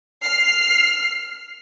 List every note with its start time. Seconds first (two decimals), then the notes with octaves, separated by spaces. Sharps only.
0.25 F6 C7